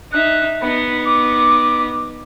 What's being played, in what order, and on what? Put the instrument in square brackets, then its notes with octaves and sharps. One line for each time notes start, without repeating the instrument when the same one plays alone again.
[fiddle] D#4 E5 [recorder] F#6
[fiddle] B3 D#4 [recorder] B5
[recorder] D6